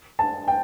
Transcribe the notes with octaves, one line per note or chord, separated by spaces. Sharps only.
A5
G5